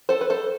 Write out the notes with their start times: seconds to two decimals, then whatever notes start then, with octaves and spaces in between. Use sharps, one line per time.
0.09 A4 C5
0.21 B4
0.30 A4 C5